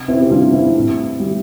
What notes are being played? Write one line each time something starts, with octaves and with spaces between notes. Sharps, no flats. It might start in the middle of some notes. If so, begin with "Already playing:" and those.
Already playing: C3
C4 E4
G4
G3 D4 F4
C4 E4
A2
G3